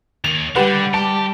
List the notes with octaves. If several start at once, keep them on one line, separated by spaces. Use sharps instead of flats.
D#2 D#3 F7
D3 G3 G4 B4 F#5
G4 A5